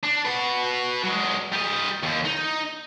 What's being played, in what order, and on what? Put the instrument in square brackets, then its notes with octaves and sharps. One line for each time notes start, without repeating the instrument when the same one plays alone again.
[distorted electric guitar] D4
F#4 B4
F#3 G#3
G3 D#5
D#2
D#4